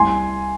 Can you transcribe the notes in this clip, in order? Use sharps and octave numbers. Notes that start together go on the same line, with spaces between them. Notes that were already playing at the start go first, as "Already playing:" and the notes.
Already playing: C2 G#5 C6